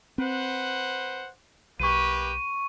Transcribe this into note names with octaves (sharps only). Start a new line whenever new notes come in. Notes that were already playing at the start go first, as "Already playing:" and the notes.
C4 B4 C5 F#5
B1 A#3 G4 B4 C#6 D#7